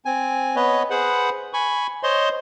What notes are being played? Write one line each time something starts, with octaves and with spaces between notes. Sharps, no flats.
C4 G#5
B3 B4 C#5 D#5
G#4 B4 C5 F#5
G#5 B5 C#6
C5 C#5 D#5 C6